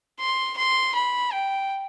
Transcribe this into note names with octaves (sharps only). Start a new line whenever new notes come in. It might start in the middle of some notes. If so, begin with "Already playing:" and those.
C6
C6
B5
G5